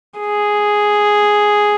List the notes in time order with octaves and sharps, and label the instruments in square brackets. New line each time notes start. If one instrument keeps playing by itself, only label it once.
[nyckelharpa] G#4